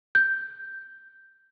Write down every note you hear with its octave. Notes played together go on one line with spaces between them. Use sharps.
G6